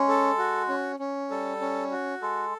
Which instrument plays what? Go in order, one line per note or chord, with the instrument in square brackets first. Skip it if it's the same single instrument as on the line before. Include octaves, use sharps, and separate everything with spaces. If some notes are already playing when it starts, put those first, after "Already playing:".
Already playing: [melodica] G#3 [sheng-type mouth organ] C#4
[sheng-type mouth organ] A4
F#4
C#4
C#4
[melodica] G3 [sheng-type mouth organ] A4
[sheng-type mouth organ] C#4
F#4
[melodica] G#3 [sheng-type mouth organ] A4